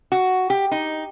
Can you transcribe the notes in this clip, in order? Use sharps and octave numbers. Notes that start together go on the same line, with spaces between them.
F#4
G4
D#4